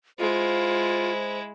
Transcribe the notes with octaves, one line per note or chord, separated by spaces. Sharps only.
G#3 E4 F4 C5